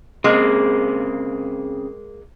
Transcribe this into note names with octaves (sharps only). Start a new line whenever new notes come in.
C#3 G#3 A#3 C4